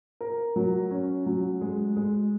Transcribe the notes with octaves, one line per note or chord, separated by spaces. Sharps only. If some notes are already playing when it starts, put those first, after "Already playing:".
A#4
F#3
C#4
F#3
G#3
G#3